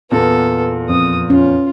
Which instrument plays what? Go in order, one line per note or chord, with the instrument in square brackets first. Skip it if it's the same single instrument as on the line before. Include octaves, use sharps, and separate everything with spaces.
[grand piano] E2 A#2 [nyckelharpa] B3 A4
[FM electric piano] F2 [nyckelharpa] D#6
[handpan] C#4 [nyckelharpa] F4